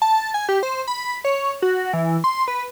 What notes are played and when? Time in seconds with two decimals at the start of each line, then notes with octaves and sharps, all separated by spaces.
0.02 A5
0.34 G#5
0.49 G4
0.63 C5
0.88 B5
1.25 C#5
1.62 F#4
1.93 E3
2.24 C6
2.48 B4